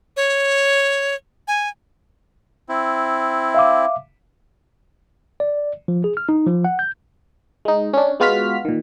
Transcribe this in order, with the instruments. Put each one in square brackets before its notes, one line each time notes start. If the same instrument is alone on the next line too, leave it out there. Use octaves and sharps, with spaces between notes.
[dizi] C#5
G#5
[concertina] C4 E4
[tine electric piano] E5 F5 D6
D5
F3
G#4
F6
D#4
F3
F#5
G6
[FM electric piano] G#3 D#4
C#4 D4
G#3 B3 F4 F#4 F6 B6
A#2 D#3